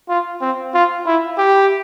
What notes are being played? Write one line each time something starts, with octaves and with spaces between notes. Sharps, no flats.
F4
C4
F4
E4
G4